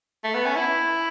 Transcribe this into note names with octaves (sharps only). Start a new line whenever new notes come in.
A3
B3
C#4
E4